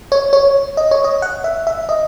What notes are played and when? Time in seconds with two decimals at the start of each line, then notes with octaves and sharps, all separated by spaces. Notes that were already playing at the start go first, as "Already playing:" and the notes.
0.12 C#5
0.33 C#5
0.77 D#5
0.91 C#5
1.04 D#5
1.22 F#5
1.44 E5
1.67 E5
1.89 D#5